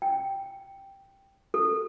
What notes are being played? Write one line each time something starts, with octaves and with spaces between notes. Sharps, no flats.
G5
A4